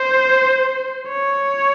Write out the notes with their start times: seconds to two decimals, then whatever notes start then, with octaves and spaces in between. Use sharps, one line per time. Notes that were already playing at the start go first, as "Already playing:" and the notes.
Already playing: C5
1.08 C#5